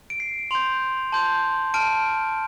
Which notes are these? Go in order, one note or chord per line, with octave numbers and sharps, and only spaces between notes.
D7
C7
C6 G6 F7
A5 C6 G6
A5 F6 D7